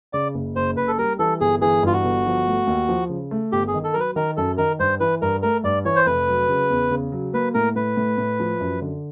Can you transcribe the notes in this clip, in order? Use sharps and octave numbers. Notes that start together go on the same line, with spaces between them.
C#3 D5
F#1
F#1 C5
F#1 B4
A4
G3 A#4
E3 A4
G1 G#4
E3 G#4
G2 F4
F#4
G1
F3
A3
D#2
F3
C#3
A3
G1 G4
G#4
D#3
A4
F#3 A#4
B4
D#3 A#4
F#2 A4
D#3 A#4
G2 C5
E3 B4
G2 A#4
A3 A#4
G2 D5
E3 C#5
C5
F1 B4
F#3
C#3
E2
C#3
F#3
A#3 B4
A2 A#4
A2 B4
A2
A2
F3
F#2
D3